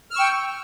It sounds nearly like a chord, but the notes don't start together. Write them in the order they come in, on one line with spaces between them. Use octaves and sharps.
F6 E6 C#6 G5